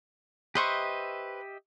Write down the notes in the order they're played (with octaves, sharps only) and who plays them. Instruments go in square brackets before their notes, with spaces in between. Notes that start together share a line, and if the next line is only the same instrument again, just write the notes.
[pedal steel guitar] G4 D#5 E5 [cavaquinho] B4 C5 C#6